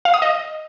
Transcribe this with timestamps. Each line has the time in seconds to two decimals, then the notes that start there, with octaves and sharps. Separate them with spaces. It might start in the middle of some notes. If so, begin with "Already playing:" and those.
0.05 F5
0.14 D#6
0.22 D#5